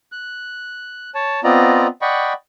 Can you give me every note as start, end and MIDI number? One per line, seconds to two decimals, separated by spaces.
0.12 1.10 90
1.15 1.40 73
1.15 1.40 81
1.44 1.87 59
1.44 1.87 60
1.44 1.87 65
1.44 1.87 74
1.44 1.87 75
1.44 1.87 82
2.02 2.33 74
2.02 2.33 75
2.02 2.33 78
2.02 2.33 79
2.02 2.33 83
2.02 2.33 85